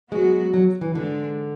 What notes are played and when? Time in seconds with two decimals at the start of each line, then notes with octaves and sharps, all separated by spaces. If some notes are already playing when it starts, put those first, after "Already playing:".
0.12 F#3 G#3 B3 F#4
0.54 F#3
0.81 E3
0.95 G#2 D3 G#3 D4